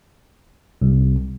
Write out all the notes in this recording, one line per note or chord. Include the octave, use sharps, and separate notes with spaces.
C2